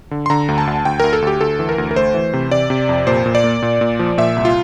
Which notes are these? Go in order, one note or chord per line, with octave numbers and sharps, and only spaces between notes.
D3
C6
D3 A#5
D2
A5
D2
D2 G5
D2 A#4
A4
D2 G4
D2 A4
E3
A#4
D2
A#4
A3 C5
E3
C3
C3 D5
C3
F2
A#2 C5
A#2
D5
A#3
A#2
A#2
F3
A#2 E5
C2
F4